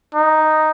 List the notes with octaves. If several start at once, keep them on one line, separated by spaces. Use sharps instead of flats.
D#4